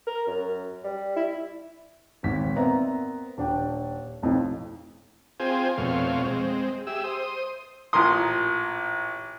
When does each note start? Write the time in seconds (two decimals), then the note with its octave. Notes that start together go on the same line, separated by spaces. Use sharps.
0.07 A#4
0.27 F#2
0.84 G3
1.16 E4
2.23 D#1 G#1 B6
2.56 B3 C4 A#4 D5 E5 A#5
3.38 D#1 D4 G5
4.23 B1 F2 A2
5.40 C4 F4 G#4 C5 G5 G#5
5.78 F2 B2 A3 C4 C#5 F5
6.25 G#3 C4
6.87 G4 G#4 E5 E6
7.04 C5 D#6
7.93 A1 A#2 A#4 C6 D#6